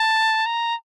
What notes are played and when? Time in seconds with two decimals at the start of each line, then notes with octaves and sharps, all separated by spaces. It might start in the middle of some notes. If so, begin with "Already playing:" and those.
Already playing: A5
0.46 A#5